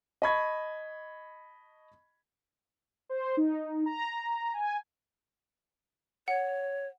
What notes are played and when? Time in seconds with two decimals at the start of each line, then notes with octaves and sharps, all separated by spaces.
0.22 D#5 A5 B5 C#6 G#6
3.09 C5
3.37 D#4
3.86 A#5
4.54 G#5
6.28 C#5 F#5